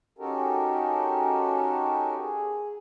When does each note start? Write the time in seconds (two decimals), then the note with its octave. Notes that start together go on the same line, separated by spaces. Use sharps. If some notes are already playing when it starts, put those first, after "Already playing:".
0.19 C#4 D#4 F#4 G4 A4 A#4
2.19 G#4